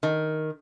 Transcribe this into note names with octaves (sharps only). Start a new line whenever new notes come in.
D#3